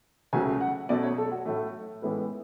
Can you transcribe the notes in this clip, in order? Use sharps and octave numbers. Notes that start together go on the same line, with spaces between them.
C#2 C#3 F#3 A3 G#5
F#5
B2 F#3 A3 D5
C#5
A4
F#4
A2 F#3 A3
A2 E3 G#3 B3